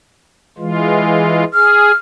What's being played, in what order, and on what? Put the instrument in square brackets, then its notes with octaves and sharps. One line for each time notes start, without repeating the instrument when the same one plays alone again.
[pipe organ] E3 G#3 F4
[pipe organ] G#4 [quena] F6